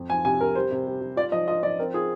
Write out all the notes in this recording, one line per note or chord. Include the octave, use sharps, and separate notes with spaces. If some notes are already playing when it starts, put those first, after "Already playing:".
Already playing: F2
F3 G#5
C3 G#5
C3 A#4
G3 C5
C3
G3
G3
F4 D5
F3 D#5
F4 D#5
F3 D5
C4 A#4
F4 G#4